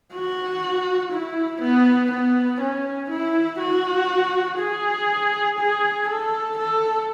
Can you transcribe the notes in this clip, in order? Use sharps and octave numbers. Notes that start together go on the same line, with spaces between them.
F#4
E4
B3
B3
C#4
E4
F#4
G#4
G#4
A4
A4